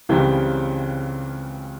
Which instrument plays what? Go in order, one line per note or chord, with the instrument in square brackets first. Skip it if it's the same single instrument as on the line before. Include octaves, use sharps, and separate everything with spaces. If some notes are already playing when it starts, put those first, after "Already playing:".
[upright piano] C#2 C#3 E3 G3 C4